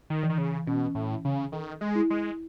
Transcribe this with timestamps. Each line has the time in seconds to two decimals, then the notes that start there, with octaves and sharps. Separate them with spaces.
0.10 D#3
0.23 E3
0.30 D#3
0.38 C#3
0.67 B2 C#4
0.95 A2
1.09 E3
1.25 C#3
1.52 D#3 A4
1.81 G#3
1.95 E4
2.10 G#3